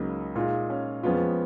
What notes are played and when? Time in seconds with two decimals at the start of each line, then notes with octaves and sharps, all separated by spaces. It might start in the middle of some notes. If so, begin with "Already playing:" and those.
Already playing: C#2 C#3 F#3 A#3 D#4
0.35 A#2 G#3 D#4 F4
0.70 C#4
1.03 F2 F3 G#3 B3 C#4 F4